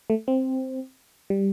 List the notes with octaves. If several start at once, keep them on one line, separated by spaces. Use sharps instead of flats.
A3
C4
G3